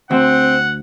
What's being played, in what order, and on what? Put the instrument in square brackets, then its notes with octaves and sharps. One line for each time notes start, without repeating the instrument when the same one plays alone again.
[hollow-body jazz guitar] D2 [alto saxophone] C4 [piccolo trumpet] F#5